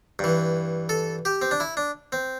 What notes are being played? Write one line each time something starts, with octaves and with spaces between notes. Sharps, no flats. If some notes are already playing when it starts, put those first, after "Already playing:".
G2 E3
A4
G4
C4
D4
E4
D4
C4